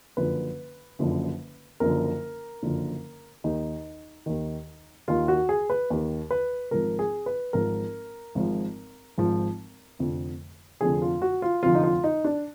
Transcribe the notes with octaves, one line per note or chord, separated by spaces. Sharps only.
F#1 F#2 D3 F3 B4
F#1 F#2 D3 F3
F#1 F#2 D3 F3 A#4
F#1 F#2 D3 F3
D#2 D#3 D#4
D#2 D#3
D#2 D#3 F4
F#4
G#4
B4
D#2 D#3
B4
G#1 G#2 F3 A#4
G#4
B4
G#1 G#2 F3 A#4
G#1 G#2 F3
G#1 G#2 F3
F1 F2 D3 F3
F1 F2 D3 F3 G#4
F4
F#4
F4
F1 F2 D3 F3 F4
D#4
F4
D#4
D4